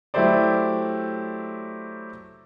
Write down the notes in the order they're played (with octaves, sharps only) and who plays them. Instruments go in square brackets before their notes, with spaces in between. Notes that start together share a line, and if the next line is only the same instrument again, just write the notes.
[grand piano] F#3 A3 E4 G4 C5 D5